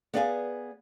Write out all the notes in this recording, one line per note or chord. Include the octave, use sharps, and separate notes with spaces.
B3 G#4 D5 F5 F#5 G#5